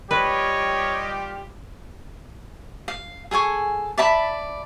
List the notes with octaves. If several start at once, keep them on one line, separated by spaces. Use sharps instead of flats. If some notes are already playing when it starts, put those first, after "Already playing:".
G3 F4 G4 B4 C#5 D#5
F5
G#4 A4 G#5 C#6
D5 E5 A5 B5